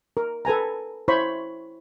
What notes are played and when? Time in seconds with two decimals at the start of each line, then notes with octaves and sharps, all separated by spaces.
0.17 A#4
0.45 A4 B4 G#5 A#5
1.08 E4 C5 C#5 B5 C#6